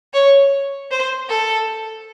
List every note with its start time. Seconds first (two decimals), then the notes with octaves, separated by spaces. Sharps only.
0.13 C#5
0.91 C5
1.29 A4